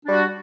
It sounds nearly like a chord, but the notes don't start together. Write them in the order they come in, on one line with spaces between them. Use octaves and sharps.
D4 G3 F#4